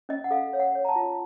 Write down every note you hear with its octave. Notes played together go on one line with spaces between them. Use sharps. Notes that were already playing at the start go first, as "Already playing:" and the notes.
C#4 D#5
F#5
A4 F5
C#5 F5
F#5
C#5
A#5
A5
F4